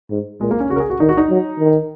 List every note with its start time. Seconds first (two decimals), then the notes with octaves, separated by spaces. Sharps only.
0.11 G#2
0.41 A#2 G#3
0.51 A#3
0.60 C#4
0.70 C#3 F#4
0.76 A#4
0.80 G#4
0.90 F#4
1.00 D#3 D#4
1.09 F#4
1.17 D#4
1.30 F#3
1.60 D#3